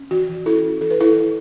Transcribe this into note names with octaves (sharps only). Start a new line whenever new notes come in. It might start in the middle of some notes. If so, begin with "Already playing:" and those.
Already playing: C#4
E3 F#4
E3
C#4 E4 A4
C#4
E3 A4
B4
E3 E4 A4
E3